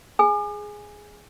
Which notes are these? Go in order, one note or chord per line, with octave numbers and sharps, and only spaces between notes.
G#4 G#5